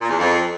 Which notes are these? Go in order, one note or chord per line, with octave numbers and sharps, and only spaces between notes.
A#2
E2
F2